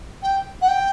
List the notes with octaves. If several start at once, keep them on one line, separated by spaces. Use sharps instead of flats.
G5
F#5
G5